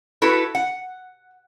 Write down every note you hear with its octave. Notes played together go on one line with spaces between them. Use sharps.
E4 F#4 A4 B4
F#5